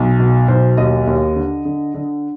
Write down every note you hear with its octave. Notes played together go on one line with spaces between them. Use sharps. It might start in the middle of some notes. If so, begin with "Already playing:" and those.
Already playing: B1
B2
B1 C5
D#2 D#5
D#2
D3
D3
D3